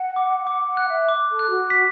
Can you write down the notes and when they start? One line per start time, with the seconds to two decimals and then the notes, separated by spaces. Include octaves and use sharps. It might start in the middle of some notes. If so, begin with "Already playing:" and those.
Already playing: F#5
0.16 D6
0.47 F#5 D6
0.67 F#5
0.77 F#6
0.88 E5
1.09 D6
1.29 A4
1.39 F#6
1.49 F#4
1.70 B6